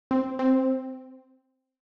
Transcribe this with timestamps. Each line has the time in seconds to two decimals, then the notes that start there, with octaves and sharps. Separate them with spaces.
0.11 C4
0.39 C4